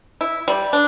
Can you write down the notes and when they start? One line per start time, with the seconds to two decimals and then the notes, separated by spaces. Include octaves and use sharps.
0.21 E4
0.48 G3
0.73 D4